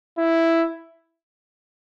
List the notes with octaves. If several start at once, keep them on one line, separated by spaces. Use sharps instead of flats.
E4